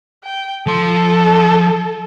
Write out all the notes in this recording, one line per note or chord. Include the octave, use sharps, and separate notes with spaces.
G5
F3 A4 C6